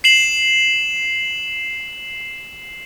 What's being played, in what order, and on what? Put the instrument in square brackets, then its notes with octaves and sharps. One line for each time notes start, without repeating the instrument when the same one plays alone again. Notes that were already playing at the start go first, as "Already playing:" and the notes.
[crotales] C7 E7 F#7